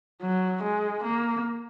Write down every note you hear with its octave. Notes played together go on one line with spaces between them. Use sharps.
F#3
G#3
A#3